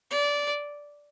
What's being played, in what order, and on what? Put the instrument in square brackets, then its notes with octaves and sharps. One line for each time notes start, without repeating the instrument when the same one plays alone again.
[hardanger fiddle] D5